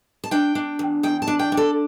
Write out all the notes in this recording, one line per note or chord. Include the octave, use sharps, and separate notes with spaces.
A5
D4 G5
D4
E2
E2 G5
A5
D4
G5
D4
A4